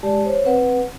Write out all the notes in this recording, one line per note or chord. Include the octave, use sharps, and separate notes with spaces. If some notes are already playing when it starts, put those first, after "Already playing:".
G#3 G4 D5 A5
C5 C#5
C4 B4 F#5